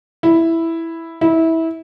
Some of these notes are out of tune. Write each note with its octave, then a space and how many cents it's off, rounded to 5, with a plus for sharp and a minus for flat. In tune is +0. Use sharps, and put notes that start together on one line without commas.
E4 +0
E4 -20